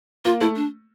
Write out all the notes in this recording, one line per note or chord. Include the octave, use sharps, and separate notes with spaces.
A#3 F4
A3 E4
D4